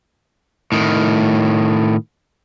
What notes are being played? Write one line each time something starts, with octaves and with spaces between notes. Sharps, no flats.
A2 D#3